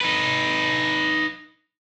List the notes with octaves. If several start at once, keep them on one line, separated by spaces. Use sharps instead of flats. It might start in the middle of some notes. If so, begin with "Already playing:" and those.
D#4 B4